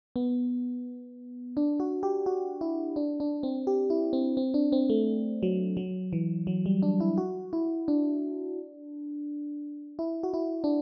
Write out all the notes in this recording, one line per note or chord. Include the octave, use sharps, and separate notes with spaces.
B3
D4
F#4
G4
F#4
E4
D4
D4
C4
G4
E4
C4
C4
D4
C4
A3
F#3
F#3
E3
F#3
G3
D4
E4
F#4
E4
D4
E4
F#4
E4
D4